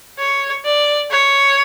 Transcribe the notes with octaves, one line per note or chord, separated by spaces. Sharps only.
C#5
D5
C#5